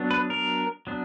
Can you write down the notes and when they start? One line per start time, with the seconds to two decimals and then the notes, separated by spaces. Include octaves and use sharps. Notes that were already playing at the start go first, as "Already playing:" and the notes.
Already playing: F#3 B3 D4
0.11 B4
0.30 A#4
0.87 F#3 B3 D4